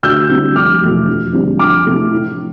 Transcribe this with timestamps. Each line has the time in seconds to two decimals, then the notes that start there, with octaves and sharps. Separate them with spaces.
0.03 D2 E6 G6
0.29 D3 G3 C4 E4
0.55 F1 D6 F6
0.82 E2 B2 A3
1.08 F2
1.33 D3 G3 C4
1.59 F2 D6 F6
1.85 C3 E3 A3 E4
2.12 A2